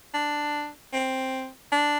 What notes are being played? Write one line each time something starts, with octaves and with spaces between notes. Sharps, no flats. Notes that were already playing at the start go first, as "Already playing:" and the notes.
D4
C4
D4